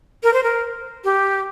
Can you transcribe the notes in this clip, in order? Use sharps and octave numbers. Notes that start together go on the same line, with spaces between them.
A#4
C5
A#4
G4